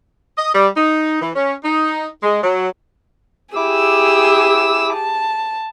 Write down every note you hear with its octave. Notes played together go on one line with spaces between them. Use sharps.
D#5
G3
D#4
E3
C#4
D#4
G#3
F#3
E4 G4 G#4 D6 E6
A5